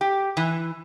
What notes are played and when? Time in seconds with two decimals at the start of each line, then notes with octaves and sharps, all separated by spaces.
0.01 G4
0.37 E3